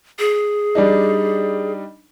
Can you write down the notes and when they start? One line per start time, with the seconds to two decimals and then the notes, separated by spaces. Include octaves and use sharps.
0.19 G#4
0.75 G3 D4 D#4